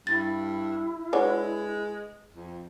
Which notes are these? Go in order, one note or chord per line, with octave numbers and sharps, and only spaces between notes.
G2 E4 A6
G#3 D4 F#4 B4 C#5
F2